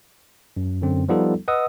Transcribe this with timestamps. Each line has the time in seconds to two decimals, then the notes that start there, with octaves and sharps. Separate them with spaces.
0.57 F#2
0.82 F#2 D3 C4
1.08 F3 G3 B3 D#4 F4 A4
1.48 B4 D#5 F#5 D#6 E6